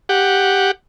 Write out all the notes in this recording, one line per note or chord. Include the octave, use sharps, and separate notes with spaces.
G4 F#5